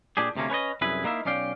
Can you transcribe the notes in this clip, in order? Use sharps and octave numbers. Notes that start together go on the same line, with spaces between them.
A#2 D4 G4 G#4
D2 C3 F3 A#3 C#4
C#4 B4 C#5 D#5
C2 F#2 E4 G#4 B4
A#3 D#4 E4 E5 F5
B1 C#4 D5 F5 G5